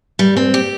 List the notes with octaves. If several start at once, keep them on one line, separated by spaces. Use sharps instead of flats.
G3
C4
G4